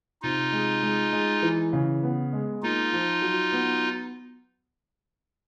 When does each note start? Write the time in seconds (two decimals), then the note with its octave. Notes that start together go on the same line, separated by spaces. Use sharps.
0.22 C3 D#4 F4
0.52 G#3
0.83 G#3
1.13 G#3
1.42 E3
1.73 C#3
2.03 B3
2.33 G#3
2.62 A#3 D#4 F4
2.93 F3
3.22 F#3
3.52 B3